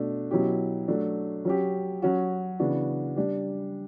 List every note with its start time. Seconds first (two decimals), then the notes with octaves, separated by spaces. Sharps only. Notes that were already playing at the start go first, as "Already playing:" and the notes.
Already playing: B2 A3 D4
0.31 B2 F#3 C#4 E4 G4
0.88 F#3 A3 D4
1.45 F#3 C#4 G4
2.02 F#3 C#4 F#4
2.59 C#3 E3 B3 D4 F#4
3.16 G3 D4 G4